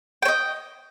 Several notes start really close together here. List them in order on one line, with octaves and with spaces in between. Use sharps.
G5 C#5 D#5